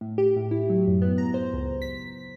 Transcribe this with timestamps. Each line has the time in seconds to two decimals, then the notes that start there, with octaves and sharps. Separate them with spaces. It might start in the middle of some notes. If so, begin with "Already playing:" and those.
0.01 A2
0.18 G4
0.36 A2
0.51 E4
0.70 F#3
0.87 F#2
1.02 B3
1.18 A#5
1.34 C5
1.54 C#2
1.82 B6